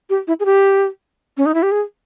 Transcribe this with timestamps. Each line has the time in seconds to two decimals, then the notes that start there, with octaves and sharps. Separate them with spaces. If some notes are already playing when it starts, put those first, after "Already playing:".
0.10 G4
0.28 E4
0.40 G#4
0.46 G4
1.37 C#4
1.46 D#4
1.54 E4
1.63 G4
1.72 G#4